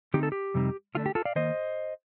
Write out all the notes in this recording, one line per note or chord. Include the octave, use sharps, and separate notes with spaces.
D3 A3 C4 D#4 G4
A4
G4
F2 C3 G3 C4 D#4
D3 A3 D4 F4
G4
F4 A4
D5 F5
D#3 A#3 C5 D#5